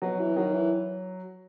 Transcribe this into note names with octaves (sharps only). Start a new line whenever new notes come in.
B2 F#3
E3
D#3 F#3
E3